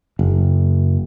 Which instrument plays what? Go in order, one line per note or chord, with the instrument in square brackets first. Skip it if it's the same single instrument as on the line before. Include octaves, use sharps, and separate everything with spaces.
[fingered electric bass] F#1